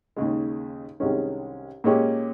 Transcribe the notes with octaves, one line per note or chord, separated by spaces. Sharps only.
D#2 C#3 G#3
C2 C3 D#3 G#3 C#4
A#2 G#3 C#4 G4